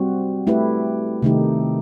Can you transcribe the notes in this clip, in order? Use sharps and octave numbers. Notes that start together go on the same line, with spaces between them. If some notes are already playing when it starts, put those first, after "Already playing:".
Already playing: G3 C4 F#4
A3 E4 G4 B4
C3 D#3 A3 D#4 G4